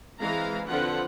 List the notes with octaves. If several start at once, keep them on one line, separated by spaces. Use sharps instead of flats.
E3 G#3 C4 F5 A#5
D3 F3 C4 F4 B4 F#5